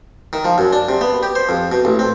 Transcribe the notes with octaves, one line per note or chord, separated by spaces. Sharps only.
D#3
F3
F#2
D4
C3
B3
G4
C5
F2
B2
A1
C4